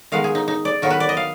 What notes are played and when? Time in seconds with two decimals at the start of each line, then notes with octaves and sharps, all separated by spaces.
0.12 D#3 G#3 B3 F5
0.24 G#4
0.35 D#4
0.48 D#4
0.65 D5
0.82 D#3 F#3 B3 A#4
0.90 B4
1.00 D5
1.09 D#5
1.17 F5